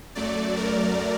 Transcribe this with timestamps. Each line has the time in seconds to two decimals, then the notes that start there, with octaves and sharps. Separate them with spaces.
0.15 F#2 F#3 A3 D5
0.56 A#4